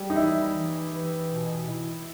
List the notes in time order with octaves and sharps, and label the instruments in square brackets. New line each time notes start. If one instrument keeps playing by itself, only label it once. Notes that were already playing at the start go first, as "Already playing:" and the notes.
Already playing: [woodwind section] G3 [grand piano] G4
[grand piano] D#4
[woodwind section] E3 [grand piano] E4
[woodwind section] E3
E3
B2
E4